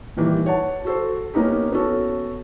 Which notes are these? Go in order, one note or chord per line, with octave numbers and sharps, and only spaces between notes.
A#2 D#3 E3 G3
C#5 F#5 A5
F#4 A4 C5
A#3 B3 C#4 D#4 G4
B3 C#4 F#4 A4